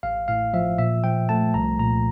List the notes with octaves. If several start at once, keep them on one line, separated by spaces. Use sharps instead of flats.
A1 F5
A2 F5
F3 E5
A#2 E5
F3 G5
A3 A5
C2 A#5
A#2 A#5